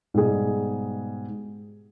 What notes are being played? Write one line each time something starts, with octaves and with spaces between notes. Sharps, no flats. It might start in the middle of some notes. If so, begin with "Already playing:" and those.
G#2 B2 G3 G#4